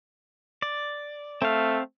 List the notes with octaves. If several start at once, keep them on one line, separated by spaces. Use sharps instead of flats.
D5
A3 C4 F5